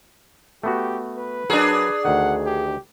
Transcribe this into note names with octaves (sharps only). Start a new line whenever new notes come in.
A3 B3 F#4 G4
B4
F#3 D4 G#4 A#4
D2 D#3 F#5
G4